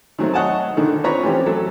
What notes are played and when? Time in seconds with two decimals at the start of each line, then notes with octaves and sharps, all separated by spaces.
0.19 D#3 F#3 A3 C4
0.34 C#5 D#5 F#5 G#5 A5
0.77 D3 D#3 A4
1.04 C4 F4 B4 C#5 A#5
1.23 E3 F3 A3 C4 C#4 G4
1.46 F#3 A4